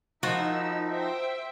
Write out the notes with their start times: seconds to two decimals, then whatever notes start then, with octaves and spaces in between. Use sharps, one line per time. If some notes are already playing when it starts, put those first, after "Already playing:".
0.23 F3 D#4 E4 F#4 A#4 E6
0.91 C5 E5 G5